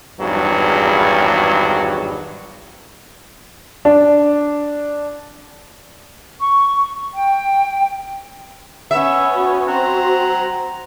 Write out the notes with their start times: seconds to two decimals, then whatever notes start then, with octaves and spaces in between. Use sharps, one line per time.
0.19 G#1 E2 G2 F#3
3.85 D4
6.39 C#6
7.14 G5
8.91 B3 C#4 E5
9.35 F#4
9.68 C4 C5 F#5 A#5